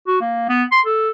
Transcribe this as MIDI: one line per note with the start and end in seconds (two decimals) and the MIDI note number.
0.07 0.20 66
0.21 0.48 58
0.49 0.64 59
0.72 0.81 84
0.86 1.10 69